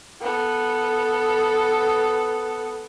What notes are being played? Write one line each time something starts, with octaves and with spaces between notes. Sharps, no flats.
B3 A4